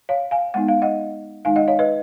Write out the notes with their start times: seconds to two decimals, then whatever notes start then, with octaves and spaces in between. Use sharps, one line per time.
0.09 C#5 F5
0.31 F5 G#5
0.54 G#3 B3 D#4 F#5
0.68 F5
0.82 D#5 F#5
1.45 D#3 G#3 D#4 F5 G#5
1.56 D#5 F#5
1.67 C#5 F5
1.79 B4 D#5